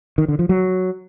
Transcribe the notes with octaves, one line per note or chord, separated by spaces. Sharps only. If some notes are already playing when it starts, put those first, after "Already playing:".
D#3
D3
F3
F#3